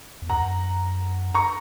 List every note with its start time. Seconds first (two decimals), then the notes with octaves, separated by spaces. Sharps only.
0.22 E2
0.29 F#2 F#5 A#5
1.34 A#5 C#6